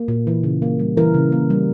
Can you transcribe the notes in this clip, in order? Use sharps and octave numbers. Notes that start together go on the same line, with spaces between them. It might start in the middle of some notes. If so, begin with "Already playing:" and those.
Already playing: A#3
A#2
E3
C#3
A#3
G3
E3 A#4
C#3
A#3
G3